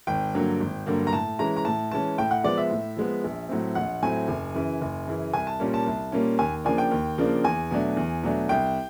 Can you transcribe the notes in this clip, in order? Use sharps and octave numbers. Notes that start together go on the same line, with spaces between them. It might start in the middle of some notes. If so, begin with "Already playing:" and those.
G#1 G5
G2 D3 F#3 A#3
G#1
G2 D3 F#3 A#3
A#5
A2 A5
E3 G#3 C#4 A#5
A#5
A2 A5
E3 G#3 C#4 A5
A2 G5
F#5
F3 G#3 B3 D5
E5
A2
F3 G#3 B3
A#1
A2 F#3 A3 C4
A#1 F#5
A2 F#3 A3 C4 G#5
F#1
F#2 C#3 E3
F#1
F#2 C#3 E3
C2 G#5
A5
A#2 G3 A#3 C#4
A5
C2
A#2 G3 A#3 C#4
D#2 G#5
C#3 F3 A#3 D4 G#5
G5
D#2
C#3 F3 A#3 D4
E2 G#5
B2 F#3 A3 D4
E2
B2 F#3 A3 D4
C2 G5